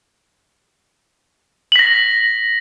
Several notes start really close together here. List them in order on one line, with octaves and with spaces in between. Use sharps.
F#7 B6 A#6